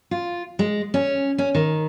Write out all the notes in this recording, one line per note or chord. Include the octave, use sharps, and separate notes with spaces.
F4
G#3
C#4
C#4
D#3